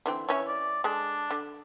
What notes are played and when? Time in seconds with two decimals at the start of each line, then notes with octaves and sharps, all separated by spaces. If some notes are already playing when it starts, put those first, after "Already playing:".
0.06 D3 E3 C4
0.29 E3 C#4 E4 C#5
0.47 D5
0.84 G#3 D4 A4
1.31 D3